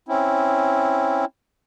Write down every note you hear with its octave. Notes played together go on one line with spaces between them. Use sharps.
C4 C#4 E4